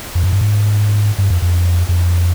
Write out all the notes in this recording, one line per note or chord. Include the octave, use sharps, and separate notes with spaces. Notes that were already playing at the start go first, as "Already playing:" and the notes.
F2
F#2
G2
G#2
G2
F2
F2
F2